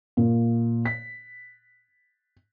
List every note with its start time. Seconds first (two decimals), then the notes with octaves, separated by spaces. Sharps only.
0.17 A#2
0.85 B6